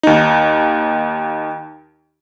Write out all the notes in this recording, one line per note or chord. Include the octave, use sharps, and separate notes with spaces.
D#2 D#4